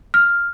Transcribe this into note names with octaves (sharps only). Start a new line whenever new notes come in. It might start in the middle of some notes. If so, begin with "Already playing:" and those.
F6